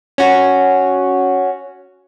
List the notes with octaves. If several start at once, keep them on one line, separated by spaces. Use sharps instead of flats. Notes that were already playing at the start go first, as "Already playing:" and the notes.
C#4 F#4